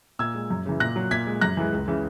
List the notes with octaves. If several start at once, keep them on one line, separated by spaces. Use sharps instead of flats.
A#2 E6 G#6
G#3
F#2
C#3 E3
A#2 F#6 A#6
F#3
A#2 G#6 B6
G#3
F#2 F#6 A#6
E3 G#3
C#2
C#3 E3